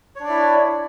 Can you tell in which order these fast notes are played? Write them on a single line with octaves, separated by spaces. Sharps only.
C#5 D4 D5 E4